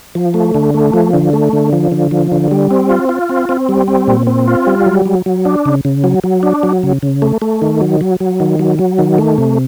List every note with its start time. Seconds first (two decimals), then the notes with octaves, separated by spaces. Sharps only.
0.15 F3
0.34 A3
0.55 D3
0.74 A3
0.93 F3
1.13 D3
1.33 A3
1.53 D3
1.73 F3
1.92 D3
2.11 F3
2.32 D3
2.51 G3
2.71 C4
2.89 F4
3.09 F4
3.29 C4
3.49 C4
3.69 G3
3.88 C4
4.08 A#2
4.27 C4
4.48 F4
4.67 G3
4.86 F#3
5.06 F#3
5.26 F#3
5.45 D4
5.65 C#3
5.85 C#3
6.04 F#3
6.24 F#3
6.43 D4
6.63 F#3
6.83 C#3
7.03 C#3
7.22 A3
7.42 A3
7.62 D#3
7.81 F#3
8.01 F#3
8.20 F#3
8.40 D#3
8.59 F#3
8.79 F#3
8.99 D#3
9.18 A3
9.38 C3